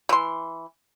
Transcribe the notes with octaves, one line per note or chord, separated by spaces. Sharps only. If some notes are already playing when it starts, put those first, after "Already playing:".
E3 C6